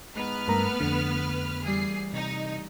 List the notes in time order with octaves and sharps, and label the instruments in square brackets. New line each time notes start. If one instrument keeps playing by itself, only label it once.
[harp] G#2 A#5 F#6 [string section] B3 B4 F6
[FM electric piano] G2 A#4 A#5 [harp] A3
[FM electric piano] F2 D3
[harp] E3 G3 [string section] G#4 C7
[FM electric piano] C3 [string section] D#4